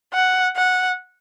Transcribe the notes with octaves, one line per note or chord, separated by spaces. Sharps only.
F#5
F#5